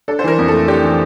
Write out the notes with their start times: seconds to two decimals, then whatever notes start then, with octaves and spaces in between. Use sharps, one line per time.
0.08 D4 A4
0.19 C5
0.24 E3 A#4
0.39 F2
0.48 A4
0.53 A3
0.68 D4 G4
0.83 E3